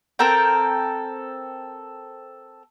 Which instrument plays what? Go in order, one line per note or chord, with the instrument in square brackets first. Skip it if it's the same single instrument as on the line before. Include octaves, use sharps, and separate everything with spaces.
[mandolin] C4 A4 A#4 G5